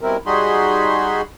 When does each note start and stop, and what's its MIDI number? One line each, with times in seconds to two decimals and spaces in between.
0.01 0.17 47
0.01 0.17 55
0.01 0.17 60
0.01 0.17 64
0.01 0.17 70
0.26 1.22 55
0.26 1.22 63
0.26 1.22 66
0.26 1.22 68
0.26 1.22 83
0.26 1.22 84